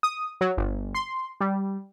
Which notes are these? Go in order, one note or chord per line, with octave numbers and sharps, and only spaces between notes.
D#6
F#3
G1
C6
G3